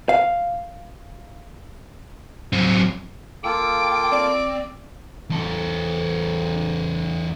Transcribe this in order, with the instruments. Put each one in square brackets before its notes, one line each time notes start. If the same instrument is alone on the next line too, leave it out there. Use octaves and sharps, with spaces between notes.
[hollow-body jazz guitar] F5
[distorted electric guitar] F#3 C4
[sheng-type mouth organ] A#3 F4 A4 [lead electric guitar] G5 [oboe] D6
[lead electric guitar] C4 [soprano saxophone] D5
[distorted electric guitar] E2 A4